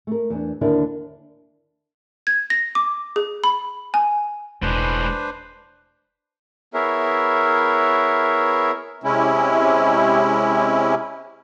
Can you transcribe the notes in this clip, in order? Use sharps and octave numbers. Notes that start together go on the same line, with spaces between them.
A3 A#4
E2 D4
D#2 D3 D4 E4 A#4 D5
G#6
A#6
D6
G#4
B5
G#5
E1 A2 G#3 D4 B4 C5
B3 E4 G#4 A#4 C#5 E5
C3 G#3 C#4 E4